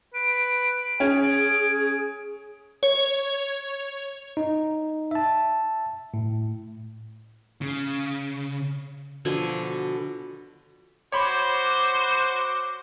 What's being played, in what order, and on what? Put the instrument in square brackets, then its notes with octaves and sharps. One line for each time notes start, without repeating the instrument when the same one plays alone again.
[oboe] B4 [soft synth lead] D7
[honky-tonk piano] C#4 [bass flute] G#4 [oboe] G#5
[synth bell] C#5
[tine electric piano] D#4
E5 A5
A2
[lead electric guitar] C#3
[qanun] B2 D3 F3 G#5
[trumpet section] F#4 C5 [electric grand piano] C#5 B5 C6 [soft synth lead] D6